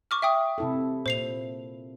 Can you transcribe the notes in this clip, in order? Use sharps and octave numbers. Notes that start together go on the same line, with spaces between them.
C#6 D6 F6
E5 G5 D#6
C3 E4 A4
A#2 C5 C7 F7